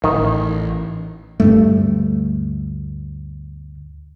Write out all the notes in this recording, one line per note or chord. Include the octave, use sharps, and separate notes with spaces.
A1 D#3
D2 G2 A3